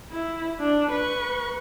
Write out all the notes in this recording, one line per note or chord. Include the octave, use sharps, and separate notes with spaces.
E4
D4
B4 C#6